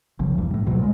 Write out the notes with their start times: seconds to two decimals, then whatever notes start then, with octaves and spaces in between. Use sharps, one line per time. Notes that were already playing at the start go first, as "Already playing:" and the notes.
0.19 F#1 B1 C#3 F3
0.35 E2 G2
0.54 A2
0.67 D2 B2 D3 F#3
0.79 A#2 G#3